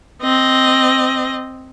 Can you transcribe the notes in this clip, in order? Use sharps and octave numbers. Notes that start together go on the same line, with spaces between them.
C4 D#5